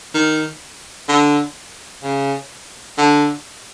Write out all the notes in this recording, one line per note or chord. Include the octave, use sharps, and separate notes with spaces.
D#3
D3
C#3
D3